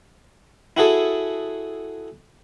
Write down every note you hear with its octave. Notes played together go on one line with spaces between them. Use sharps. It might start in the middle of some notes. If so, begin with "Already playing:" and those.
E4 F#4 G#4 A4